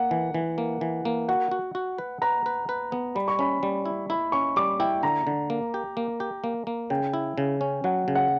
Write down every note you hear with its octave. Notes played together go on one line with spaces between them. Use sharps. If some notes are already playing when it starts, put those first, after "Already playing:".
Already playing: A#3 F#5
E3
E3
A#3
E3
A#3
F#4 F#5
F#4
F#4
B4
B4 A#5
B4
B4
B3
G3 B5
C#6
C#4 B5
G3
E4
E4 B5
C#4 C#6
G3 D6
E4 G5
D3 A#5
D3
A#3
G4
A#3
G4
A#3
A#3
C#3 G5
E4
C#3
C#4
F#3 F#5
C#3
F#5